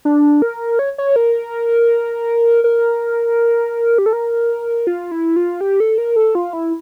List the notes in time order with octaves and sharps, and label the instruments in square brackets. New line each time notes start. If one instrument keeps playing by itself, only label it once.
[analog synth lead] D4
A#4
C#5
C#5
A#4
A#4
G4
A4
A#4
F4
E4
F4
G4
A4
A#4
A4
F4
E4